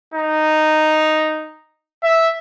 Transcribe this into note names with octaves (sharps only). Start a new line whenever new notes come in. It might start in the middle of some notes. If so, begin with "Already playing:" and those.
D#4
E5